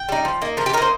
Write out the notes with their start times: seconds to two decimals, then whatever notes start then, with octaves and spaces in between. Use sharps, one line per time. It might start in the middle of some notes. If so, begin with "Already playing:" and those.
Already playing: G5
0.09 G3 D#4
0.25 F3
0.42 A#3 D#4
0.57 F3 A#4
0.66 G4
0.73 D#4 A#4
0.78 A#3 C5